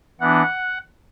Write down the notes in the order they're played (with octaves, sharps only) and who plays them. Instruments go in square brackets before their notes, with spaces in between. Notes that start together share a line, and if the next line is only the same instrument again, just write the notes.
[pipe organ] E3 B3 D4 F#5